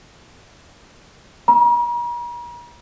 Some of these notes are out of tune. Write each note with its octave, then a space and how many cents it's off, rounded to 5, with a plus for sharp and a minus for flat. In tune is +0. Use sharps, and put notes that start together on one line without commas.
A#5 +45